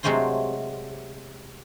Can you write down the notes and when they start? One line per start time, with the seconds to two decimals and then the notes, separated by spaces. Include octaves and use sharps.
0.03 C3 F#3 G#3 A3 C5 C6